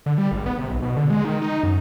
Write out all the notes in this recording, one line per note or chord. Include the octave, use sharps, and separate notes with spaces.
D3
G3
G#1
B3
C3
B1
B2
D3
G#3
D#3
D#4
F#2